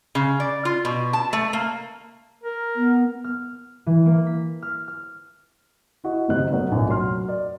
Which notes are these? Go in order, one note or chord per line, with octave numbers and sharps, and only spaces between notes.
C#3
D5
F4
B2
A5
A3
A#3
A#4
B3
F6
E3
A#3
B6
F6
F6
E4 F#4 D#5
F#1 C3 D#3 F#3 D#5 F#6
F#3 B3 A4 A#4 C#5
F1 A#1 D#4
F#3 A#4 C6 F6
D5